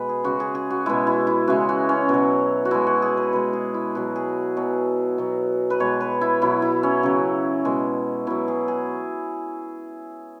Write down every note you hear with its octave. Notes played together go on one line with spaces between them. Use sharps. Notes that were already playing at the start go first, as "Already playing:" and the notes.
Already playing: B2 G#3 B4
G#4
C#3 G#3 F#4
G#4
G#4
F#4
B2 G#3 E4
E4
E4
C#3 E3 G#3 F#4
F#4
C#4
B2 F#3
F#4
B2 G#3 E4
F#4
G#4
B4
B2 G#3 B4
G#4
E4
B2 F#3 F#4
G#4
B2 F#3
B2 F#3
B4
B2 G#3 C#5
B4
E4
B2 F#3 E4
E4
C#4
C#3 F#3
B2 G#3
B2 F#3 E4
G#4
G#4